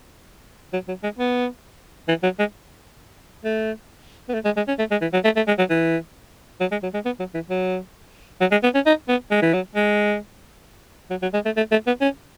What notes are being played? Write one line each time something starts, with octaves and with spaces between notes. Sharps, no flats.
F#3
F#3
G#3
B3
E3
F#3
G#3
A3
B3
A3
G#3
G#3
C#4
A3
G#3
E3
F#3
A3
A3
G#3
F#3
E3
F#3
G#3
F#3
G#3
B3
F#3
E3
F#3
F#3
G#3
B3
C#4
D#4
B3
G#3
E3
F#3
G#3
F#3
F#3
G#3
A3
A3
A3
B3
C#4